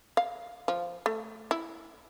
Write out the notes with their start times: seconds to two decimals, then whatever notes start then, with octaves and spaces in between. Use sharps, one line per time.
0.17 F5
0.68 F3
1.06 A3
1.51 E4